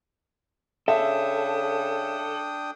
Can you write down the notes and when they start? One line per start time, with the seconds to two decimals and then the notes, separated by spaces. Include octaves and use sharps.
0.88 C#3 D4 A4 E5 G5 D#6